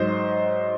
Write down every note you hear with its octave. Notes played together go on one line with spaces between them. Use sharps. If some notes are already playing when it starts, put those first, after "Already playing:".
Already playing: G#2 F#3 C5 D#5